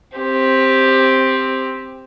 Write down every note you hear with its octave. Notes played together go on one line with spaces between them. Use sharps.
C4 G4